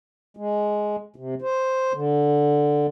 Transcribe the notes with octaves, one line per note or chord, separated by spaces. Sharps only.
G#3
C3
C5
D3